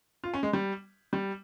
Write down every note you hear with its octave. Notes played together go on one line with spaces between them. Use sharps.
F4
C#4
G#3
G3
G3